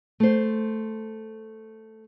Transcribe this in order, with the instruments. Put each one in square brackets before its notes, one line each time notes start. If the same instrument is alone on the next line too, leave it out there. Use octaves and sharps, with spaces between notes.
[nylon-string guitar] A3 C5